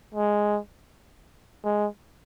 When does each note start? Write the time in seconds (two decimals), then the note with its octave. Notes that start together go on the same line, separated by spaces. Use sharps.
0.15 G#3
1.64 G#3